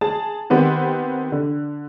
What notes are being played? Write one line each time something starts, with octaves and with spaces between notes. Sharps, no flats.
G#4 A5
D#3 B3 C4 G4
D3